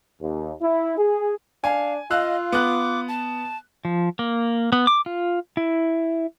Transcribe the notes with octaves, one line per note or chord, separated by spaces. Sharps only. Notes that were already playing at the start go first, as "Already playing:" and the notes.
D#2
E4
G#4
D4 F5 G#5
F4 D#5 F5 E6 F#6
B3 D6 F#6
A5
F3
A#3
B3
D6
F4
E4